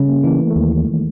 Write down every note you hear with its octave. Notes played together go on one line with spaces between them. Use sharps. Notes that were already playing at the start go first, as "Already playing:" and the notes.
Already playing: C#3 G3
A#3
E3 A#3
A3
A3
D#2 G#3
E3
D#3